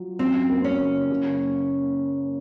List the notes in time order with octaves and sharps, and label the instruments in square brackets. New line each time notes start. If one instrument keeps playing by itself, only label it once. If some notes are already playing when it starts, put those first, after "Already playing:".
Already playing: [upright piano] F#3 F4
[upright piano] F#2 [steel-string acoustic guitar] C4
[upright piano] A#3
[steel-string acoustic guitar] C#4
[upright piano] C#3
F#1